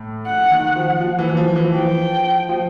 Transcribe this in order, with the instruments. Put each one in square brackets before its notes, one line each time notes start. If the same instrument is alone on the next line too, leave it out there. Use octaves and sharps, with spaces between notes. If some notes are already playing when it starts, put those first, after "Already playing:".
Already playing: [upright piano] A2
[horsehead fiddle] F#5
[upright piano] D#3
[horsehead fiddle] F#5
[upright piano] F3
F3
E3
E3
F3
E3
[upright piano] F3 [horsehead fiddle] G5
[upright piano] F3